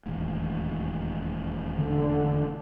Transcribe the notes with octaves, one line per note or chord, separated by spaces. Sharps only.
E1 A1 D#2
D3